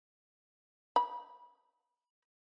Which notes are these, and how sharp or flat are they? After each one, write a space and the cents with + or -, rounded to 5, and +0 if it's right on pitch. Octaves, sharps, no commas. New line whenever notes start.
B5 -40